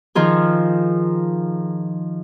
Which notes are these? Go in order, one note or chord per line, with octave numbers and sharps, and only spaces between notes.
D#3 F3 F4 G#4